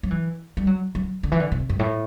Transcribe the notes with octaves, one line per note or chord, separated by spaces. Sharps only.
F#3
E3
G3
F#3
F#3
D3
E3
D3
C3
G2
A2